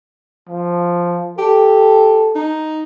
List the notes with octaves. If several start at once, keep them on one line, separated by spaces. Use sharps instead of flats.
F3
G4 A4
D#4